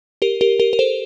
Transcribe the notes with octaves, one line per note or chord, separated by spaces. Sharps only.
G4 A#4
G4 A#4
G4 A#4
A#4
A4 C5